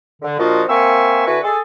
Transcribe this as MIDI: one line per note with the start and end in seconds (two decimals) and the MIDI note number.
0.22 0.39 50
0.39 0.62 46
0.39 0.62 53
0.39 0.62 62
0.39 0.62 65
0.39 0.62 66
0.39 0.62 75
0.69 1.26 58
0.69 1.26 60
0.69 1.26 76
0.69 1.26 80
0.69 1.26 85
0.69 1.26 88
1.27 1.39 50
1.27 1.39 64
1.27 1.39 66
1.27 1.39 71
1.27 1.39 80
1.27 1.39 85
1.44 1.60 68
1.44 1.60 69